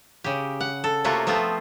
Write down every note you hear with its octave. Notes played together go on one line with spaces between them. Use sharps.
C#3 G4
F#5
A4
C3 A3 A#3 F4 F#4
F3 A3 B3 C4 F4